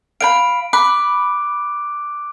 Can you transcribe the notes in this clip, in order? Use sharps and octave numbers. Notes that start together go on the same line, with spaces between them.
F5 G5 B5 D7
B5 D6 F#6